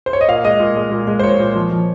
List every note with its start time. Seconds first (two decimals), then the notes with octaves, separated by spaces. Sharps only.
0.06 C5
0.13 C#5
0.21 D#5
0.28 A#2 F5
0.44 G#3 D#5
0.60 A#2
0.76 G#3
0.92 A#2
1.07 G#3
1.19 C5
1.23 A#2 C#5
1.40 A#2
1.55 F3
1.72 F3